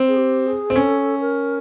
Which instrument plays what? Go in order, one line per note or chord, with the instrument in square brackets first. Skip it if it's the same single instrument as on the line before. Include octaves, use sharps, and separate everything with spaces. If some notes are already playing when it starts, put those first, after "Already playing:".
Already playing: [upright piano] C4
[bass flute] G#4
G4
G#4
[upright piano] C4
[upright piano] C#4 [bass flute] A4
[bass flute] A#4